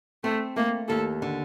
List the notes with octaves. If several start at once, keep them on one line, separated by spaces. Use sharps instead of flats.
A3 C4
A3 A#3
D#2 A4
D3